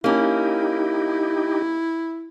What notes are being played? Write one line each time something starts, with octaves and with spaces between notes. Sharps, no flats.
A#3 C#4 D#4 E4 G4